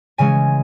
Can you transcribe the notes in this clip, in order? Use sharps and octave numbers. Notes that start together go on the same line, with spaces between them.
C#3 E3 G#3 C#4 G#5